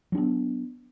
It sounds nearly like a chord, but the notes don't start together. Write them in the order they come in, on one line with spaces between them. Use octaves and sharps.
F#3 D4 B3